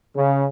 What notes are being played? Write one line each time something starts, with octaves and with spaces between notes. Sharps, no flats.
C#3